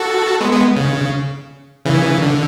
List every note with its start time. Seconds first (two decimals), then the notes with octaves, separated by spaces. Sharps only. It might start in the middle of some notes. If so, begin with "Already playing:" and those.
Already playing: F#4 A4
0.41 G#3 B3
0.52 G#3 B3
0.77 C#3
1.85 C#3 E3
2.22 D3